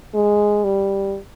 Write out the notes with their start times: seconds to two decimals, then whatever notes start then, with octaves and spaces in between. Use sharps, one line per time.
0.14 G#3
0.64 G3